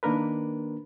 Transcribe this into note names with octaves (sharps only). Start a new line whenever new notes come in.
D#3 A#3 D4 A#4 B4